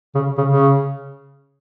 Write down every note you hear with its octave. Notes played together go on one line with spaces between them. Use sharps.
C#3
C#3
C#3